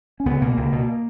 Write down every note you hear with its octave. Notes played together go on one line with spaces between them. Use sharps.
C#4
C#2 B3
B2 A#3
C#2
B2